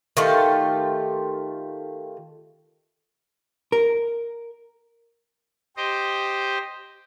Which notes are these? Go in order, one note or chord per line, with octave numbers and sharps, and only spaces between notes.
D#3 A3 F4 G4
A#4
G4 C5 D#5